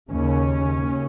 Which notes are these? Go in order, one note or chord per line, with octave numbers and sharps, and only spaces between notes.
D#2 C#3 C#4
D#2 C#3